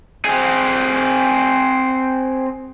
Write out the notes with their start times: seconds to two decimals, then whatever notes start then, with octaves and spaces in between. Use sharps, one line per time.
0.25 C4 G#4